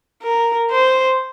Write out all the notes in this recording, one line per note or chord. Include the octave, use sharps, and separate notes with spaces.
A#4
C5